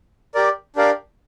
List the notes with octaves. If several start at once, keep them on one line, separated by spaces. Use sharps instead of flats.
G4 A#4 D5
D4 G4 A#4 D5 F5